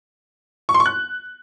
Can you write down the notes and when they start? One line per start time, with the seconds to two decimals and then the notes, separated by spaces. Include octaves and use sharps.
0.69 C#6
0.74 C6
0.80 C#6
0.86 F#6